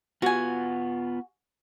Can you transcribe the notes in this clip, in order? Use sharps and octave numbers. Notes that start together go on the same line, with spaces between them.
B3 F4 F#4 G#5